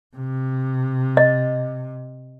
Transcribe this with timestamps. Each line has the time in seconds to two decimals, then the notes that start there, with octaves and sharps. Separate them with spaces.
0.16 C3
1.17 D#5